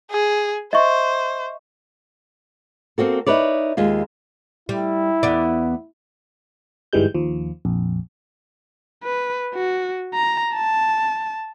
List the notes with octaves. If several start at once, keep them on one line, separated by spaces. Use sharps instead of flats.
G#4
C5 D#5 E5 C#6
A#3 C4 F#4 A4
D#4 E4 B4 C#5 D5
D#2 G#3 F4
G3 E4
E2 B3 D5
G1 G#2 E3 G3 G#3 G6
D#2 F3
A#1 F2
B4
F#4
A#5
A5